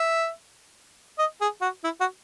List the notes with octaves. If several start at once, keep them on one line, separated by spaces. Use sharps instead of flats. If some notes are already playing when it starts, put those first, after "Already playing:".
Already playing: E5
D#5
G#4
F#4
E4
F#4